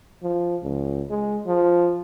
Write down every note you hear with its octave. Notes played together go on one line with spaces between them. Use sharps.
F3
C#2
G#3
F3